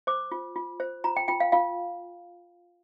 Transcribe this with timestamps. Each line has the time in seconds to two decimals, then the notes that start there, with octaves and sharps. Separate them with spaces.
0.07 C5 D6
0.32 F4
0.56 F4
0.80 C5
1.04 F4 A#5
1.17 G5
1.28 F4 G5
1.40 F5
1.52 F4 F5